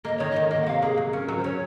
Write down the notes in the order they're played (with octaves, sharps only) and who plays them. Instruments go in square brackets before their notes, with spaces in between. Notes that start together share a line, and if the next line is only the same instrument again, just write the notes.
[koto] A#3 [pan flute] D#5
[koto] D#3 [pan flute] C#5
[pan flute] D#5
[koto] D#3
[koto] A#3 [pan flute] D#5
[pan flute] F#5
[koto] C3 [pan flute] F5
[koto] A#3 [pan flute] G#4
[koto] F#3
[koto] C#4 [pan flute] A#4
[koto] F#3 [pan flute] F#4
[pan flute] C5
[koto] C#4 [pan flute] C#5